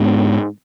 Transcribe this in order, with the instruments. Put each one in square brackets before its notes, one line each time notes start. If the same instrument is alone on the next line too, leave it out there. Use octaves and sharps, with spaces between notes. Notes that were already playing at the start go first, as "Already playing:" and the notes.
Already playing: [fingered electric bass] G#2 G#3 B3 D4